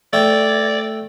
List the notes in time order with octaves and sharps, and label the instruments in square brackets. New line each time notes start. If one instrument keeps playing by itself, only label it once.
[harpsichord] A3 G5 [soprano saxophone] D5